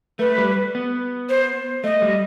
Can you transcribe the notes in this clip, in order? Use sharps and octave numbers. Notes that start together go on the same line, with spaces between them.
A3 B4
G3
B3
C5
A3 D#5
G3